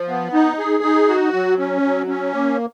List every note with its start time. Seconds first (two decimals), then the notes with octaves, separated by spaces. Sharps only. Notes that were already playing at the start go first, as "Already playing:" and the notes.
Already playing: F3
0.08 B3
0.33 D#4
0.58 G#4
0.83 D#4
1.09 F#4
1.33 F#3
1.58 C#4
1.83 F#3
2.08 C#4
2.33 A#3